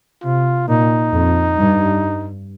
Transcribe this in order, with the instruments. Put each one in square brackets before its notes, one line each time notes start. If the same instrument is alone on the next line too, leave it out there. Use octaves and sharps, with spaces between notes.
[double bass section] C3 [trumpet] F4
[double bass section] A#2 [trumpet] D#4
[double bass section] F2
G2